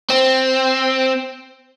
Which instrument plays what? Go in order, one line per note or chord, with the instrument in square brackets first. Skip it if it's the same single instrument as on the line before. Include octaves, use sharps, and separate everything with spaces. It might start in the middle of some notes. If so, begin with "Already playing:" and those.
[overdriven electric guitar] C4